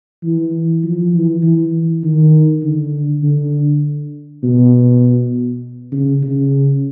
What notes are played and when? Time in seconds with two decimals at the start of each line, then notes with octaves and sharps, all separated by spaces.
0.23 E3
0.84 F3
1.13 E3
1.43 E3
2.04 D#3
2.63 D3
3.23 D3
4.43 B2
5.92 C#3
6.22 C#3